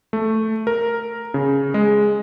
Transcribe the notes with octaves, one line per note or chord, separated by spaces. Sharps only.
A3
A#4
C#3
G#3